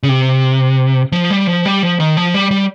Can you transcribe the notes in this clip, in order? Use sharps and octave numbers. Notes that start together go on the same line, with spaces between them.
C#3
C3
F3
G3
F3
G3
F3
D#3
F3
G3
G3